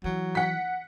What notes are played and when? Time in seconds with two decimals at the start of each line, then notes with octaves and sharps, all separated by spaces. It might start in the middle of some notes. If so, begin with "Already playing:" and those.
0.04 E3 F#3
0.35 F#5 B6